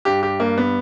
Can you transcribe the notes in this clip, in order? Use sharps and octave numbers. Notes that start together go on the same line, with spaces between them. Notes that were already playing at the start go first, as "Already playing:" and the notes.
G2 G4
G4
G2 A#3
B3